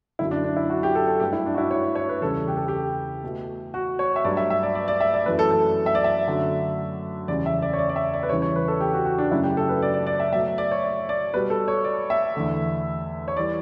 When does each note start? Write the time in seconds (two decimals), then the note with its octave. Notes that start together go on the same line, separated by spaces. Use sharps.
0.19 F#2 D3 F#3 E4
0.31 D4
0.44 D4
0.57 E4
0.70 F#4
0.83 G4
0.95 A4
1.07 A4
1.20 G2 F#3 A3 G4
1.33 E4
1.46 D4
1.54 F#4
1.58 E4
1.71 C#5
1.95 C#5
2.09 B4
2.22 E2 C#3 G3 A4
2.48 G4
2.57 A4
2.68 G4
3.24 B2 A3
3.74 F#4
3.99 C#5
4.16 E5
4.24 G2 F#3 A3 D5
4.37 E5
4.50 E5
4.63 D5
4.75 D5
4.88 D5
5.01 E5
5.14 D5
5.26 F#2 E3 A3 B4
5.39 A4
5.51 A4
5.86 E5
5.95 D5
6.04 E5
6.27 F#2 D3 F#3 A3
7.28 E2 C#3 G3 D5
7.46 E5
7.62 D5
7.73 C#5
7.79 D5
7.89 D5
7.96 E5
8.14 D5
8.23 B4
8.29 E2 C#3 E3 G3 C#5
8.42 C#5
8.56 B4
8.68 A4
8.80 G4
8.94 F#4
9.05 F#4
9.18 D4
9.31 F#2 C#3 F#3 A3 E4
9.43 G4
9.57 A4
9.69 B4
9.82 D5
9.94 D5
10.07 D5
10.20 E5
10.33 B2 F#3 A3 E5
10.58 D5
10.71 C#5
10.84 D5
11.09 D5
11.34 B2 G3 B4
11.50 A4
11.68 C#5
11.84 D5
12.10 E5
12.35 E2 D3 A3
13.28 C#5
13.37 E3 G3 D5